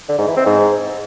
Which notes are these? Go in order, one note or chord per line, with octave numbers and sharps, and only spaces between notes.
D3
G#2
E3
C4
G#2